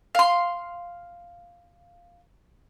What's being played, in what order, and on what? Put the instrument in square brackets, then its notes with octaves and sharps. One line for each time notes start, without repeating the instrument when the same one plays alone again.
[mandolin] F5 C6